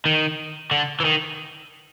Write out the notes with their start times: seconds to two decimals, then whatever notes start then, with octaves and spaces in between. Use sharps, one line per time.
0.05 D#3
0.71 D3
1.00 E3
1.05 D#3